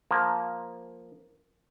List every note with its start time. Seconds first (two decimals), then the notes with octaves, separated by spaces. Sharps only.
0.11 F3 A#3